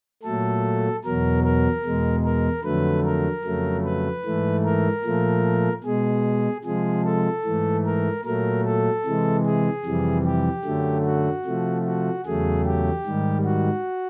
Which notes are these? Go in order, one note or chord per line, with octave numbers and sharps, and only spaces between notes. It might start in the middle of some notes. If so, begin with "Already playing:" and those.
A#2 F#3 A3 A4
E2 B2 F#3 A#4
A#4
E2 B2 G#3
A#4
F2 D3 F#3 A3 B4
A#4
F2 C#3 F#3 A3
B4
G#2 E3 A3
A#4
A#2 F3 A3
B2 G#3 G#4
C3 F3 G#3 G#4
A4
G#2 E3 A3
A#4
A#2 F#3 A3 A#4
A4
C3 E3 G#3
G#4
F2 C3 E3 G3
G4
F#2 D3 F#3 A3
F#4
C3 F3 A3
F#4
E2 C#3 F#3 A3 G#4
G4
G#2 D#3 G3
F#4